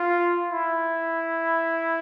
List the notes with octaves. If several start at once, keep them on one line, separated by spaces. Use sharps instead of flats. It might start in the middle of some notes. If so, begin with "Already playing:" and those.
Already playing: F4
E4